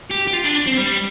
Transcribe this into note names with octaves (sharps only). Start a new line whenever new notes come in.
G4
G4
F4
D4
C4
G3